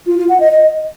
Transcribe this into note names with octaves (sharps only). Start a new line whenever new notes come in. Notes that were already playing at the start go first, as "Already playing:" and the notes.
F4
F4
F#5
D#5
D#5